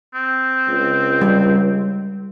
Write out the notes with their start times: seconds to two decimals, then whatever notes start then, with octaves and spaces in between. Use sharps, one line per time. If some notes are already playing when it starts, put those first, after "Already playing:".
0.14 C4
0.68 C#2
1.22 G3